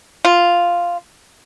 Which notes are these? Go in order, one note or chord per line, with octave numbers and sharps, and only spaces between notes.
F4